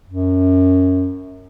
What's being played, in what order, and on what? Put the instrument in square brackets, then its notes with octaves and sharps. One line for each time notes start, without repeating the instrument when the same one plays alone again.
[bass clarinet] F#2